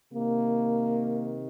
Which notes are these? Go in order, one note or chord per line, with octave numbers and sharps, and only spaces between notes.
C3 D#3 A#3